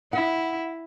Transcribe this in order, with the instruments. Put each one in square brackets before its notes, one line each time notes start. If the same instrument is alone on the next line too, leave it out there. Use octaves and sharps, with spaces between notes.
[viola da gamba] E4 [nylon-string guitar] F#5